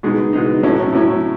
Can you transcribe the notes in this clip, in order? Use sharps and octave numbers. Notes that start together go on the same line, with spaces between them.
B2 G#3 D#4
B2 G#3 D#4
A2 F#3 C#4 E4
A2 F#3 C#4 E4